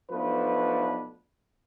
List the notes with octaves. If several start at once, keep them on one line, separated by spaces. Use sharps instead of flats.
B1 B2 F3 A3 D4 B4